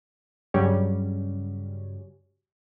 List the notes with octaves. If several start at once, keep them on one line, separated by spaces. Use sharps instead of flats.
G2 C#3 F#3 G3 C#4